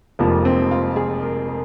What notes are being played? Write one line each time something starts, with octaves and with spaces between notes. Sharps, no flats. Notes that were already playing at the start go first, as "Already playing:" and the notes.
F1 F2 F3 G#3 A#3
C4
F4
G#4
A#4
A#4